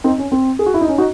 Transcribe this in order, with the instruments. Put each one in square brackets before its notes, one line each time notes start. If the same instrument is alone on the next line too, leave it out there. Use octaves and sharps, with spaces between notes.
[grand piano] C4 D#4
C#4
C4
G#4
F#4
E4
D#4
C#4
D#4 F#4